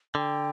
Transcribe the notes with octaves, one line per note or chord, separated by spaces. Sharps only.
D3 G5